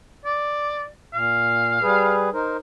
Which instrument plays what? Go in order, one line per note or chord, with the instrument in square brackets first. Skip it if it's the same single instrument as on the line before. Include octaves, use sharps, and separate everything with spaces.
[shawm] D5
[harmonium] A#2 [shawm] F5
[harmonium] G3 G#4 B4
D#4 A#4 C5